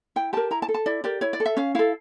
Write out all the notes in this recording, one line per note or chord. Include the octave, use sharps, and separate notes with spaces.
E4 G5
G4 A#4 A5
E4 A#5
A5
A4
A5
E4 D5
G4 A#4 D5
E4 C#5
D5
A4
E5
C#4 F5
E4 A4 F5